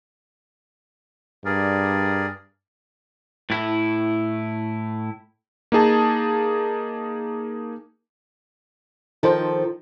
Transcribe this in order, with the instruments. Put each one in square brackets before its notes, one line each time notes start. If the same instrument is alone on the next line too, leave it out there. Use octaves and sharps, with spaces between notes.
[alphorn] G2 [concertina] G#4 A#4 D5
[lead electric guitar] A2 E4
[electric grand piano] A#3 D#4 G#4 A5
[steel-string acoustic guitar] D#3 F3 A4 [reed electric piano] D#4 C5